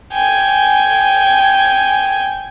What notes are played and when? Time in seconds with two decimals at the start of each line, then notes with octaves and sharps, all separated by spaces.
0.13 G5 G#5